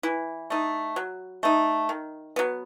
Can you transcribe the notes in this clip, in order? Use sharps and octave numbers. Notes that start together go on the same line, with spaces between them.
E3 E4
A3 D#4
F#3
A3 D#4
D#3
F#3 B3